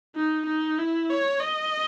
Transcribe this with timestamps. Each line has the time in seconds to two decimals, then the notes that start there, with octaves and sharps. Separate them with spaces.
0.15 D#4
0.46 D#4
0.78 E4
1.10 C#5
1.40 D#5